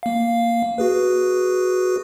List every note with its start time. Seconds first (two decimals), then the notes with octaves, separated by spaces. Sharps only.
0.03 A#3 F5
0.78 F#4 G#4 B4